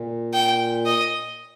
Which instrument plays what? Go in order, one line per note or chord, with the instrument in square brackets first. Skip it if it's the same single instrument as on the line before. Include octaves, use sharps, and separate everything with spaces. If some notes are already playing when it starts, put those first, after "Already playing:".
Already playing: [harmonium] A#2
[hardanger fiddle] G5
D#5